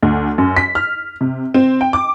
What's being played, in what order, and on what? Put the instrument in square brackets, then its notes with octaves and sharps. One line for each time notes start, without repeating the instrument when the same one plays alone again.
[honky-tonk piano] D2
F#2
B6
F6
C3
C4
G5
D6